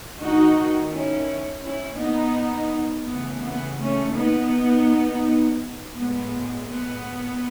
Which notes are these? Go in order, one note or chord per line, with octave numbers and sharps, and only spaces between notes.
D#3 A3 D#4 F#4
C#4 E4
C#4 E4
B3 D#4
C#3 E3 A3 B3
B3
A3 C#4
B3 D#4
A2 G#3 B3
B3